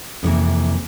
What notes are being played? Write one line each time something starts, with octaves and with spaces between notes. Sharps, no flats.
F2 C3 E3 A#3